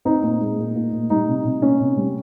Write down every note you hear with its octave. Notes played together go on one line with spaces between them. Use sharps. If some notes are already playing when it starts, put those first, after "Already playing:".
C4 D#4
A#2
G#3
A#2
A#2
A#2
G3 D#4
C3
C3
A#3 C#4
C3
G3